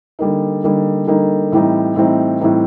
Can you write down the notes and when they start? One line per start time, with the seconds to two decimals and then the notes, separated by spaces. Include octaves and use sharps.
0.19 D3 G3 A#3 D#4
0.64 D3 G3 A#3 D#4
1.07 D3 G3 A#3 D#4
1.52 A2 E3 G3 C4 D#4
1.96 A2 E3 G3 C4 D#4
2.41 A2 E3 G3 C4 D#4